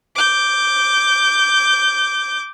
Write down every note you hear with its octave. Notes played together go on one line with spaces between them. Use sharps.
D6 G6